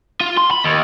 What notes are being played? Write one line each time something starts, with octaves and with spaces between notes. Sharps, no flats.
F4
C6
B5
D#2